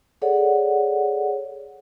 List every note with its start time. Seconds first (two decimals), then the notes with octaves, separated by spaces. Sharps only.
0.22 G#4 A4 C#5 D5 F#5